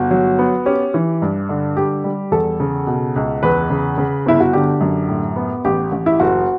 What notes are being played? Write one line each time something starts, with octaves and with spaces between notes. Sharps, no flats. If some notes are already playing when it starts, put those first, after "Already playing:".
Already playing: G1 F#4
F#3
B3
C#4 G4
E3
G2
D3
G3 G4
G3
E2 A4
C#3
B2
C#2
E2 B4
C#3
C#3
G1 E4
F#4
D3 G4
F#2
A2
B3
A1 G4
A1
E4
F#1 F#4